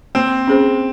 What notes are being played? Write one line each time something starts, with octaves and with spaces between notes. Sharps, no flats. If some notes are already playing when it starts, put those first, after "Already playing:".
A#3 C4
C#4 G#4 C5